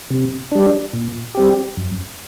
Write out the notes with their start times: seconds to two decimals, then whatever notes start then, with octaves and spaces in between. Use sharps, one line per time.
0.10 C3
0.52 G3 D4
0.93 A#2
1.35 G3 C4 G4
1.77 F#2